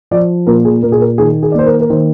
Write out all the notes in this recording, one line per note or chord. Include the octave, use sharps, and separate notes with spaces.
F3 D5
A#2 A#4
G#4
A#2 A#4
G#4
A#4
D#3 G#4
G#4
D5
A#3 C5
A#4
A#4
D#3 C5